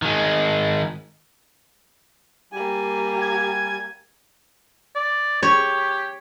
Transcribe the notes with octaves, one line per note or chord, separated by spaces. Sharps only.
D#3 G#3
G3 A#3 G4 G#5
G#6
D5
G4 C#5